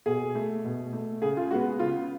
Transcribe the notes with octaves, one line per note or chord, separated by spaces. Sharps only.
B2 G#4
A3
B2
A3
C#3 G#4
F4
G#3 B3 F#4
C#3 F4